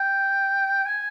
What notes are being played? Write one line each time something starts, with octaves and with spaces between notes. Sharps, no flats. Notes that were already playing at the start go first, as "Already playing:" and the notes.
Already playing: G5
G#5